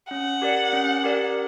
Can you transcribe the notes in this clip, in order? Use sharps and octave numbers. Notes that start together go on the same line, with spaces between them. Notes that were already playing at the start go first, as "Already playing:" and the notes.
C#4 F#5
G4 A#4 D5
C#4
G4 A#4 D5